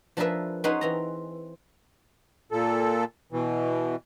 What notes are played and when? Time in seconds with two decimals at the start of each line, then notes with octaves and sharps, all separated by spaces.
0.17 F3 D4 G#4 A#4 B4 E5
0.64 C#4 D#4 G#4 B4 C5 F#5
0.81 E3 C4 A#5
2.52 A#2 A4
3.32 B2 E3